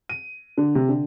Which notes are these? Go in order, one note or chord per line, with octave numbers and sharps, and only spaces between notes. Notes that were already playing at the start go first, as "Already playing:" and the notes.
D#7
D3
C3
D3